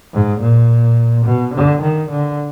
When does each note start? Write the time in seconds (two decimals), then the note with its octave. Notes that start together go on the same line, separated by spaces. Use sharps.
0.13 G#2
0.41 A#2
1.26 B2
1.55 D3
1.82 D#3
2.11 D3